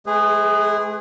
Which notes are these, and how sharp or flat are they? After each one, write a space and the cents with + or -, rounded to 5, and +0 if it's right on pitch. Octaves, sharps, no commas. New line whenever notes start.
G#3 +45 G#4 -15 B4 +25